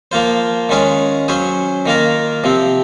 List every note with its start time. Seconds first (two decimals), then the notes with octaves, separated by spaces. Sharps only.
0.12 F3 A#3 F4 C5
0.69 D#3 G#3 C#4 F4 G#4
1.28 F#3 C#4 G#4 C5
1.86 D#3 A#3 F4 A#4
2.44 C3 F3 C4